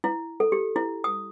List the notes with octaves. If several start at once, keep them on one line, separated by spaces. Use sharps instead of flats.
E4
A4
G4
E4
D#6